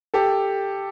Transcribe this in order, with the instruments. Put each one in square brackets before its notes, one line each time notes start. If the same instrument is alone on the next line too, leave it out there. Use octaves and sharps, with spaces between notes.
[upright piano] G4 A4